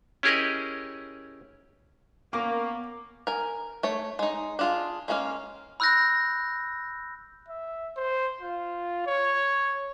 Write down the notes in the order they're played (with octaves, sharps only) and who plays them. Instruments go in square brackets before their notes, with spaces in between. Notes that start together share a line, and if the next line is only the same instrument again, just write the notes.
[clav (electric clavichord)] C#4 E4 G4 G#4 A#4 D#5
[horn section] A#3 [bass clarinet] B3 [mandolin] C#4 A#4 [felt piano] D6
[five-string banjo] A#4 G#5
A3 C#5
G#3 D#4
D4 F4 G#4
G#3 A#3 C#4 G#4 F5
[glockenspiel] B5 E6 F#6 G6 A#6
[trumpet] E5
C5
F4
C#5